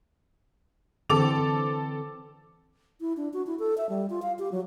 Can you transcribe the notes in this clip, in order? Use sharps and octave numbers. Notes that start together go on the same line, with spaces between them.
D3 E3 C4 A4 D6 F7
E4
D4
F#4
E4
A4
E5
G3
F4
F5
G4
F#3